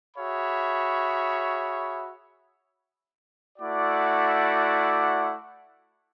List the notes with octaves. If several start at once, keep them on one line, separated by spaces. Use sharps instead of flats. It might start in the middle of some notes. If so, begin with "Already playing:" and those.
F#4 G#4 C#5 E5 B5
A3 E4 F#4 D5 F#5 D6